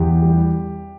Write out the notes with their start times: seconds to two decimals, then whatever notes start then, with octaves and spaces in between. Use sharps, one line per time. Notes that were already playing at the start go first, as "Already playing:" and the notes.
Already playing: E2 G4
0.22 G3